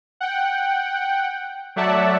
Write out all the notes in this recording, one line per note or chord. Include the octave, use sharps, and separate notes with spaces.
F#5 G5
F#3 A3 D5 E5 F#5 A5